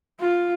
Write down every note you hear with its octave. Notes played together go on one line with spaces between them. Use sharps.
F4